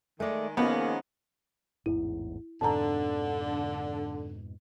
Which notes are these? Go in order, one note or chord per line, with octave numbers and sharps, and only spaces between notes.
D#3 G#3 A3 D5
D#3 F3 G#3 A#3 B3 C#4 F#5
A1 E2 G#2 E4
F2 G#2 B2 D3 A5 A#5